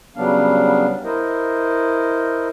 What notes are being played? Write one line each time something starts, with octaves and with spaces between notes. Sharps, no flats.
C#3 F#3 G3 B3 D4 F5
E4 A#4 C5 D#5